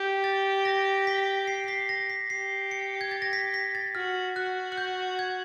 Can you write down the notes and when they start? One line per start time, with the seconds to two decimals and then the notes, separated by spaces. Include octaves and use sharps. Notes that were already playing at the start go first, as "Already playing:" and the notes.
Already playing: G4 G6
0.24 A6
0.65 A#6
1.07 B6
1.47 C7
1.64 C7
1.68 B6
1.89 A#6
2.10 B6
2.30 G4 C7
2.71 C#7
3.01 G#6
3.11 A6
3.22 A#6
3.33 B6
3.54 B6
3.75 A6
3.95 F#4 F6
4.36 F#4 F#6
4.72 F#6
4.78 G6
5.19 G#6